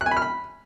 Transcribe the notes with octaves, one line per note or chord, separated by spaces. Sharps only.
F#6
G#5
B5
F6
B5